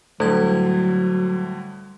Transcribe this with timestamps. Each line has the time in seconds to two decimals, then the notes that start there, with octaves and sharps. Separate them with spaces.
0.20 A2 D3 F#3 G3 A3 G#6